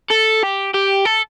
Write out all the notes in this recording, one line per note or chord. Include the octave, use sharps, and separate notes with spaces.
A4
G4
G4
A4